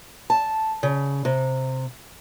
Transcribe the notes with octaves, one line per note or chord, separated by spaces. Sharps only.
A5
C#3
C3